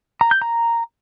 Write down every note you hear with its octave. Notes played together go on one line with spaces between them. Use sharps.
A#5
G6
A#5